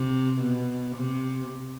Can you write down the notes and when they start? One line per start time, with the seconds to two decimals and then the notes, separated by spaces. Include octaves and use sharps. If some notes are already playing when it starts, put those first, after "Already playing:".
Already playing: C3
0.41 B2
0.96 C3